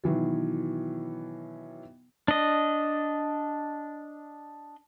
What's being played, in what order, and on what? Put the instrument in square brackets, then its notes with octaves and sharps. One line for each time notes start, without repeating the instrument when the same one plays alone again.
[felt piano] B2 D#3 E3 F#3
[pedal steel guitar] D4 D#5